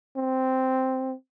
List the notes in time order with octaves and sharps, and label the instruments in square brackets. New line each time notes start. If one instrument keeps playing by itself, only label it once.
[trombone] C4